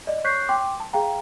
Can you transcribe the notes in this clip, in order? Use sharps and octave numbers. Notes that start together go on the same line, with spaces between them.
D5 D#5
C#5 C#6 F#6 G6 B6 C7
G5 C6 D6
A5
G#4 F5 G5 A#5